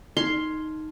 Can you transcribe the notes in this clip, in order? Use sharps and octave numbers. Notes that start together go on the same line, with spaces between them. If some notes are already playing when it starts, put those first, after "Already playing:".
D#4 C6